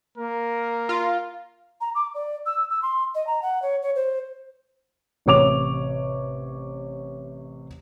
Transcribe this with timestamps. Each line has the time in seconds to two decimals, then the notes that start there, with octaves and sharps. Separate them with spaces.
0.18 A#3 A#4
0.89 F4
1.80 A#5
1.94 D6
2.14 D5
2.46 E6
2.70 E6
2.82 C6
3.14 D#5
3.26 A#5
3.42 F#5
3.62 C#5
3.82 C#5
3.95 C5
5.26 A1 C3 C#5 D6 F7